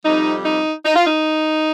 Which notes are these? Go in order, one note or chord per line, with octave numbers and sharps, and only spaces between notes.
F2 C3 G3 D#4
D#4
D#4
F4
D#4